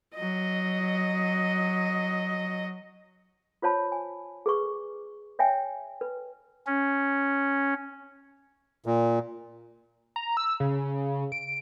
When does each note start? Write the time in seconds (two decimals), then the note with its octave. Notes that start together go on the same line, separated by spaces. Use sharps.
0.15 F#3 D#5
3.62 F4 C5 C#5 A5 B5
3.92 G#5
4.46 G#4 B4 C#6 D6
5.39 C#5 E5 G5 G#5
6.01 B4
6.67 C#4
8.86 A#2
10.16 A#5
10.37 E6
10.60 C#3
11.32 D7